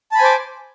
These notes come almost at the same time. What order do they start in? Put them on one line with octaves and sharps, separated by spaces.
A5 B5 G#5 C5 D6